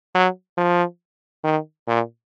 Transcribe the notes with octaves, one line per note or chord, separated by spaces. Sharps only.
F#3
F3
D#3
A#2